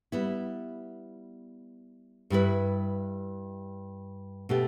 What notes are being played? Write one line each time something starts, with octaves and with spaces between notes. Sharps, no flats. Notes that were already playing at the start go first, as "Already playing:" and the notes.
G3 B3 E4
G2 G3 E4 B4
B2 A3 G4